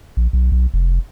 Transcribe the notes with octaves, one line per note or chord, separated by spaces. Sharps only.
A#1
B1
B1
F1